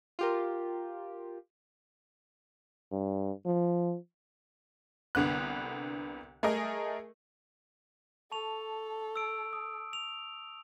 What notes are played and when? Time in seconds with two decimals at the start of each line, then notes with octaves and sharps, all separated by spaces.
0.19 F4 G4 A#4
2.92 G2
3.46 F3
5.15 C2 D3 B3 F#6
6.43 A3 G#4 A#4 D#5
8.32 A4 A5 C#6 F7
9.16 E6 D7
9.53 D#6
9.93 F7